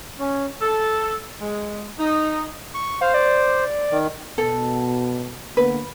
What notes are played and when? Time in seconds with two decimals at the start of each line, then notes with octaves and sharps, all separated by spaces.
0.19 C#4
0.61 A4
1.40 G#3
1.98 D#4
2.74 C#6
3.01 C5 F5
3.14 D5
3.91 D#3
4.38 B2 A4
5.57 D3 A#3 B3 B4